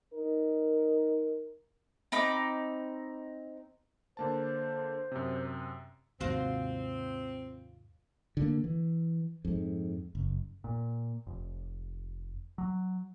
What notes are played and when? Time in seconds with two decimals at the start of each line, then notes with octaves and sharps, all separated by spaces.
0.14 D#4 A#4
2.12 C4 D#4 B5 D6
4.17 D3 A#3 C5 A5
5.12 F#2 C3
6.20 D#2 G#2 C3 C4 F4 F#4 C5
8.37 D3 A#3
8.64 E3
9.45 F2 G#2
10.15 F#1
10.64 A#2
11.27 F1
12.58 F#3